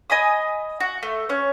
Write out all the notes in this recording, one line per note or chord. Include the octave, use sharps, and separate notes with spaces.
D#5 G#5 B5 D#6
F#4
A3
C#4 C#5